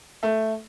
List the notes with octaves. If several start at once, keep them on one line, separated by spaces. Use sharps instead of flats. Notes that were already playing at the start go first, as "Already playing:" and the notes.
A3